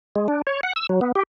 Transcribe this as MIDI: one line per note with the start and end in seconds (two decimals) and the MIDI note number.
0.16 0.28 56
0.28 0.42 62
0.47 0.61 73
0.63 0.73 78
0.76 0.87 88
0.89 1.00 54
1.01 1.12 59
1.15 1.23 67